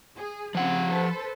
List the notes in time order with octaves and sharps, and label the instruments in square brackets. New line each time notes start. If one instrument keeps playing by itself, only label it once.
[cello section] G#4
[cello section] C#3 C4 F4 [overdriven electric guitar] F3 F#5
[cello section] A4 B4 C5